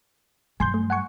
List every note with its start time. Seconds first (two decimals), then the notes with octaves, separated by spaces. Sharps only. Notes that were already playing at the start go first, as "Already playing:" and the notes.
0.60 G2 F#3 G#5 C6 G6
0.74 A3
0.90 F#5 G#5 C#6